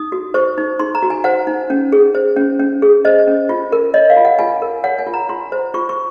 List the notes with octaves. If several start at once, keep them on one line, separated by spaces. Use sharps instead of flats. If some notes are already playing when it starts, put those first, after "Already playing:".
Already playing: D#4 D#6
F#4
C5 C#6
D#4
D#4 C6
A#5
F#4
G#5
C5 F#5
D#4
C#4
G#4
C5
C#4
C#4
G#4
C5 D#5
C#4
F4
A#4
C#5 D#5
F5
F4
F#5
F4 G#5
A#4
C#5 F#5
G#5
F4
A#5
F4 C6
C5
F4 C#6
C#6